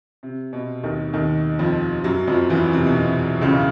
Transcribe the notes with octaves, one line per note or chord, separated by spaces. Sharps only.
C3
B2
D#2 D#3
D#2 D#3
F2 F3
F#2 F#3
F2 F3
E2 E3
C3
B2
C3
C#2 C#3